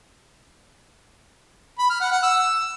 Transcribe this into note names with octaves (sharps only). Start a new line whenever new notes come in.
B5
F6
F#5
F#5
E6